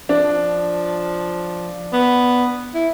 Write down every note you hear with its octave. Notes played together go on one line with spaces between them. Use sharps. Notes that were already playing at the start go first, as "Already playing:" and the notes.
F3 D4
B3
E4